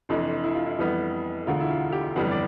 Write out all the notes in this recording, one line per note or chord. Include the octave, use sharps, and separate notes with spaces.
F1 F2 E3 D4
E4
F4
E4
F2 E3 G3 B3
E1 D2 D3 F4
E4
F4
G4
G1 F2 E3 G3 B4
D5